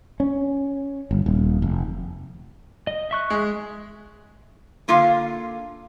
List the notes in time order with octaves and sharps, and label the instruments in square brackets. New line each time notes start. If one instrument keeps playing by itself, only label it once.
[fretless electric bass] C#4
G1
D#1
F1
[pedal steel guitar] D#5
E5 C#6 F#6
[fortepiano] G#3
[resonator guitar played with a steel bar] D3 A#3 F4 F5